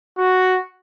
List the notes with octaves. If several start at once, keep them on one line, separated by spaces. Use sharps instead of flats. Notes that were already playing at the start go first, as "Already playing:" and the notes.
F#4